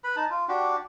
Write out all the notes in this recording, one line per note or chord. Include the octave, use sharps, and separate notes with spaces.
B4 B5
D#4 A5
F4
D4 F#4 G4